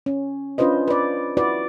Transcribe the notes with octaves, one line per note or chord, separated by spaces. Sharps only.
C#4
C#4 D4 F4 B4 C5 D#5
B4 D5
E4 F#4 B4 D5